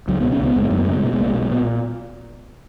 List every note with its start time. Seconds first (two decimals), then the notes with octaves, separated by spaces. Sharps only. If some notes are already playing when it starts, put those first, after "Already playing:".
0.08 C#2 F#3
0.20 B2 B3
0.32 C#4
0.40 C#2 B3
0.56 F#1 G#3
0.63 A#3
0.70 F#2 G#3
0.78 A#3
0.85 C#3 G#3
0.92 A#3
0.99 G#3
1.03 B2 A#3
1.13 G#3
1.19 B1 A#3
1.28 G#3
1.34 B2 A#3
1.42 G#3
1.50 A#2 B3